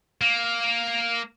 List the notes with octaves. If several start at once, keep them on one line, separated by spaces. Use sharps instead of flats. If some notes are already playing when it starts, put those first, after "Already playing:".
A#3